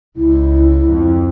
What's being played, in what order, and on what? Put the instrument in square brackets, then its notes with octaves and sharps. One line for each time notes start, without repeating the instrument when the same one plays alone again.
[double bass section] C#2 [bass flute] E4
[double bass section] F2